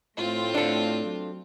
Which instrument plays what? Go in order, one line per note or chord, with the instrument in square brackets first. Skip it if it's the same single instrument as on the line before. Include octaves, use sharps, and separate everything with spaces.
[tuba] A2 [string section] A3 C4 F4
[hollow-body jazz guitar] D4 A4
[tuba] F#3